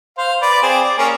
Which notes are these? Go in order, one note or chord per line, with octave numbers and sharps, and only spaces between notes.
C5 F5
B4 D5
C4 G#4
D5
A#3 C#4 G#4